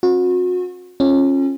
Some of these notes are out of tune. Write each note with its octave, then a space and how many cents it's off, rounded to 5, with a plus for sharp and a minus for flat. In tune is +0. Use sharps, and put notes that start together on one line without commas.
C4 +45 F#4 -35
C#4 -25 F4 -5 A4 -25